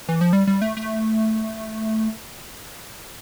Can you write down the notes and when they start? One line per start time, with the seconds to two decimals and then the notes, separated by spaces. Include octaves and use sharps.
0.09 E3
0.21 F3
0.33 G3
0.47 G3
0.62 A3
0.77 A3